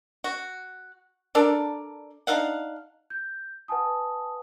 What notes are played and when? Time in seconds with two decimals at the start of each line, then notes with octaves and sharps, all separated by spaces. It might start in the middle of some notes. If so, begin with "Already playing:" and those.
0.24 F#4
1.35 D4 A4 A#4 D5
2.27 D4 D#4 F5 F#5
3.10 G6
3.68 B4 F#5 G#5 A5 D#6